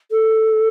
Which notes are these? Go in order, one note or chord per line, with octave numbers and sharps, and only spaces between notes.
A4